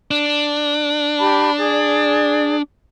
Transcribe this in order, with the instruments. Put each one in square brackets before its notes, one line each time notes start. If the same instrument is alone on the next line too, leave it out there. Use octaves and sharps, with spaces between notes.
[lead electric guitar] D4
[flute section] G4 A5 B5
G#4 D5